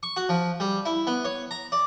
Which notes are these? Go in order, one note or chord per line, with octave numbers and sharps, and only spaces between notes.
C#6
F#4
F3
G3
E4
B3
C#5
A#5
D5